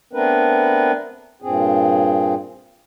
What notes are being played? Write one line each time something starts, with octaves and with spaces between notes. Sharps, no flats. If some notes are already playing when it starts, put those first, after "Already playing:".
A3 B3 C4 D4 A#4 B4
G2 A#2 C4 G#4